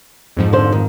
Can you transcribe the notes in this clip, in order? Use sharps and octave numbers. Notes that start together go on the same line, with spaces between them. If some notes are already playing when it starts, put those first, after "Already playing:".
F2 G#2 F3
D3 C5
D#3